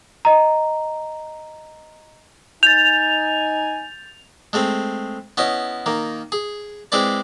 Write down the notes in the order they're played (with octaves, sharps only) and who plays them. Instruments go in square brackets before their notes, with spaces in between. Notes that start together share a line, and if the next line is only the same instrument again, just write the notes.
[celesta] D#5 A#5
[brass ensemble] D#4 G#5 [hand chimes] G6 A6 [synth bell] F7
[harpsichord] G#3 A3 C4
B3 C#4 E4 D#5
D#3 A#3
G#4
G#3 C4 E4 B4 D5